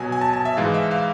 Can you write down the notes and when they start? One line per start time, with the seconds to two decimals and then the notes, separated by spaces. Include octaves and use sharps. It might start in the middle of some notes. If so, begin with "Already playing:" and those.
Already playing: B2 F#3 G#5
0.12 G#5
0.21 A5
0.33 A5
0.45 E5
0.57 G#2 E3 G#3 F5
0.74 E5
0.91 F5